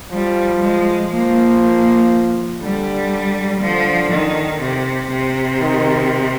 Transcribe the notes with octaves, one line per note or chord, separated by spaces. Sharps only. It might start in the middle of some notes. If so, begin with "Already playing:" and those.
F3 G3
G#3
F3 A#3
A#3
D3 G3
D3 F3
D#3
C3
C3
D#3